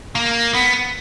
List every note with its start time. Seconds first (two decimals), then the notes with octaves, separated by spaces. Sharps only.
0.15 A#3
0.54 B3